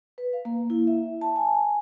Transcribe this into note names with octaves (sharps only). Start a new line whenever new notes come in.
B4
F5
A#3
E4
E5
A5
G#5